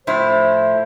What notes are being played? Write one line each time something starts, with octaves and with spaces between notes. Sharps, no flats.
A2 F3 E4 C5